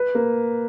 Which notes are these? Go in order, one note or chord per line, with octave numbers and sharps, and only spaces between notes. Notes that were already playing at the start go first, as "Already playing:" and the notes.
Already playing: B4
A#3